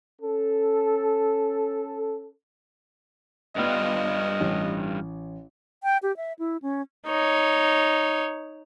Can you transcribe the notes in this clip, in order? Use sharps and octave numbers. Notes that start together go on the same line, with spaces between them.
C#4 A4
G2 G3 B3 D4 F4 D#5
A1
G5
G4
E5
E4
C#4
D#4 C#5